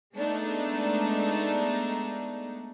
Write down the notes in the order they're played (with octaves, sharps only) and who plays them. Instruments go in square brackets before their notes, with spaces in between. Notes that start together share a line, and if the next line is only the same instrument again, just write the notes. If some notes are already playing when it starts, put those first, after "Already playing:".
[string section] G#3 A3 B3 D4 D#4